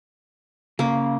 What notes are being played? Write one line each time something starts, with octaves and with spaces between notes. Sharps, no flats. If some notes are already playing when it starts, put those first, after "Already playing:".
C#3 A#3